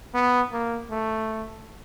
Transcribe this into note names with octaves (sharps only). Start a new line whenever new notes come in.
B3
A#3
A3